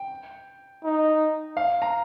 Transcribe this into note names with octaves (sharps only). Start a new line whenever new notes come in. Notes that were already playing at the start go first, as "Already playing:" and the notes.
Already playing: G5
D#4
F5
A#5